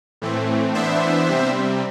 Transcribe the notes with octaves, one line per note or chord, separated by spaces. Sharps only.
A2 E3 A3 C4
E3 B3 D4 C5 E5
C3 G3 C4